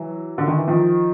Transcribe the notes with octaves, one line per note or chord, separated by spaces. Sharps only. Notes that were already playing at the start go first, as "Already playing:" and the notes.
Already playing: E3 F#3
D3
D#3
E3
D#3 F3